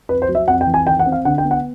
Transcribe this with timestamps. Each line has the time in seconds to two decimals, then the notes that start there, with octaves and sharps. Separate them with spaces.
0.09 F2 B4
0.22 C5
0.28 F#3
0.35 E5
0.48 F2 F#5
0.61 G5
0.67 E3
0.74 G#5
0.87 D#3 G5
0.99 F#5
1.06 C4
1.12 F5
1.25 D3 F#5
1.38 G5
1.44 B3
1.51 F#5